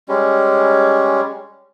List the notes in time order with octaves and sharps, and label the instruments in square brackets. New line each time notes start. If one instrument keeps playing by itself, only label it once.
[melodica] G3 G#3 C#4